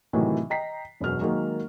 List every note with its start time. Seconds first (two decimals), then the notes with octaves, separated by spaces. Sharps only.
0.13 A2 C3 D#3 E3 F#3 A3
0.50 D#5 G5 A#5 B6 C7
1.00 E1 F#2 B2 F#3 F6
1.21 D#3 F#3 G#3 A#3